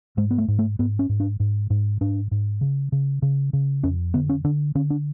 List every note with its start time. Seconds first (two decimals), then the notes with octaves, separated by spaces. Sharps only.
0.17 G#2 G#3
0.31 B3
0.38 A3
0.48 G#2
0.59 A3
0.79 G#2 B3
0.99 C#4
1.09 G#2
1.20 D4
1.40 G#2
1.70 G#2
2.01 G#2 D4
2.31 G#2
2.61 C#3
2.92 C#3
3.22 C#3
3.53 C#3
3.83 F2 C#4
4.14 D3 B3
4.29 C#4
4.44 D3 D4
4.75 D3 C#4
4.90 D4